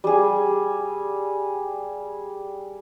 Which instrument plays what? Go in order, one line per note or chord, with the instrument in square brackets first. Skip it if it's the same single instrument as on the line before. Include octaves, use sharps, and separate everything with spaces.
[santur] G3 G#4